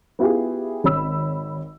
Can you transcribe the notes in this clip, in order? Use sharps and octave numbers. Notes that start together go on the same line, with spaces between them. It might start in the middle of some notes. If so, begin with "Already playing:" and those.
B3 E4 F4 G4 G#4
G#1 C#5 B5 E6